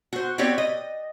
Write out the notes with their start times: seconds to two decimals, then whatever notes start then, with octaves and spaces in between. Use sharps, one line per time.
0.13 F#4 C5
0.38 B3 C4 F#4 G4 C#5 D5
0.58 D#5